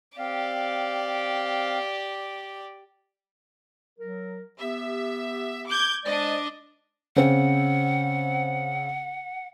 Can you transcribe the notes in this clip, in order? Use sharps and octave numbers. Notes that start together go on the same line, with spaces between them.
C4 G4 D5 F5
F#3 A#4
B3 G4 E5
D6 G6 G#6
G#3 D4 C5 D5 D#5
C#3 C4 F#5